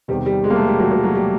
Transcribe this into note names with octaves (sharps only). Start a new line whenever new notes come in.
E2 C3 D#3 G3
G3
G#3
A#3
A3
G3
F#3
F#3
F#3
G3